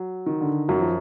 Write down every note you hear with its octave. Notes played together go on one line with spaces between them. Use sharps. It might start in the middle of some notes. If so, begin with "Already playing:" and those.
Already playing: F#3
D#3
D3
F#2 F#3
F3